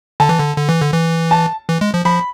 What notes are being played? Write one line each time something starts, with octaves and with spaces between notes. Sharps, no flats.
D3 A5
E3
D3
D3
E3
D3
E3
A5
E3
G#3
F3
F3 B5